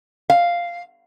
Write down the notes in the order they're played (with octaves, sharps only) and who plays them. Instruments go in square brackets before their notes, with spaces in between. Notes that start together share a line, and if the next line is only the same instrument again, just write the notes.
[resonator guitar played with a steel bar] F5